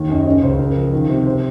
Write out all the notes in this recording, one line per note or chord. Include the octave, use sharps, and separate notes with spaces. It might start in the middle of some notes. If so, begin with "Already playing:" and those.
Already playing: D#2 D#3
F#2 D#5
D#5
C#3 C#5
C#2 C5
C#3 A#4
F3
D#3
C3
C5